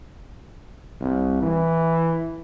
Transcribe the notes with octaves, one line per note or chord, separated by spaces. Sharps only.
C2
E3